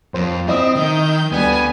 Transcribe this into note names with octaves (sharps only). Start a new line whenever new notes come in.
F2 F4 C5
C4 E4 D#5 E5 D#6
D#3 G6
D2 G3 B3 G#5